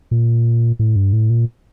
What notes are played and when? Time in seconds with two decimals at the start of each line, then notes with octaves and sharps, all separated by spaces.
0.11 A#2
0.79 A2
0.96 G2
1.13 A2
1.30 A#2